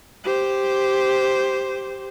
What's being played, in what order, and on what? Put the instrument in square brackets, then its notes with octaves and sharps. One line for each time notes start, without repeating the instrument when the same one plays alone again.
[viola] G4 C5